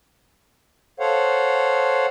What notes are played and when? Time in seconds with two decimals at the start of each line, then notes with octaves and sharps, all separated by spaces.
1.00 A4 C5 C#5 F5 F#5